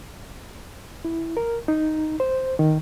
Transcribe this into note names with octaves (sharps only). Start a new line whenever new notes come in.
E4
A#4
D#4
C5
D#3